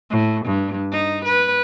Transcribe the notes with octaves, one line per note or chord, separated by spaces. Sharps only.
A2
G2
D#4
B4